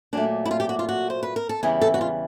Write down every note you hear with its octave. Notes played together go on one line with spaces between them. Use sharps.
A#2 F#3 A3 D4
E4
F4
G4
F#4
F4
F#4
C5
B4
A#4
A4
E2 C#3 E3 G3 G#4
A4
F#4
F4